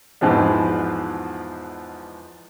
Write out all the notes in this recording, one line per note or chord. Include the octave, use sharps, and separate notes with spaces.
E2 G#2 B2 F3 G#3 B3